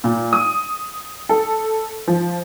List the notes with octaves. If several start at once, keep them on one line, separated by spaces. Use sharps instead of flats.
A#2
D#6
A4
F3